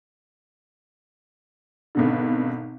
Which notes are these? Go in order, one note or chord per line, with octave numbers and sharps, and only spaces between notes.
G#1 B2 D3